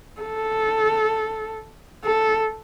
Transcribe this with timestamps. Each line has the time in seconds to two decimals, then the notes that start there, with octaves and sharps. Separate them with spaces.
0.21 A4
2.05 A4